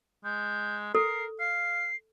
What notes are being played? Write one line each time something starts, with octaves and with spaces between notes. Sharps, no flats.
G#3 G6
A4 A#4 C7
F5 C7